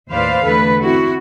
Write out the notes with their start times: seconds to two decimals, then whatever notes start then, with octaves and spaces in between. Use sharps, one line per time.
0.12 D#2 A2 B4 C5 D5 F5
0.45 E2 D3 A3 A4 B4
0.81 C4 E4 F#4